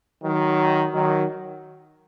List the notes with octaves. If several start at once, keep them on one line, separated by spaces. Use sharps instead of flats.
D#3 F#3
D#3 F#3